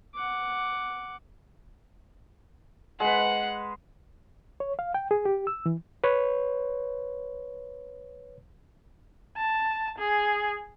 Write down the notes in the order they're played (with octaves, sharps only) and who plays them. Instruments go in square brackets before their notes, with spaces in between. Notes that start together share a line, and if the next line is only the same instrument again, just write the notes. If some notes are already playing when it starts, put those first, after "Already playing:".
[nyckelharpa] F#5 D6
[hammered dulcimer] G#3 B4 [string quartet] F#5
[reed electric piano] C#5
F5
G5
G#4
G4
E6
E3
B4 C#5
[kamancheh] A5
G#4